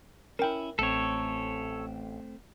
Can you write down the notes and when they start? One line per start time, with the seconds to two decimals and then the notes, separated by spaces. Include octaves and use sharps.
0.39 C#4 E4 A#4 G5
0.79 A1 A3 C4 A4 C#5